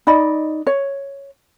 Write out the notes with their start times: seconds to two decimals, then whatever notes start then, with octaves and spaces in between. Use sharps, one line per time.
0.07 D#4 D5 D#5 B5
0.67 C#5